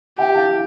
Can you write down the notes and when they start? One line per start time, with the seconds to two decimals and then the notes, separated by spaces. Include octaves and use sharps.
0.19 G4 E5 G5
0.34 F5 A5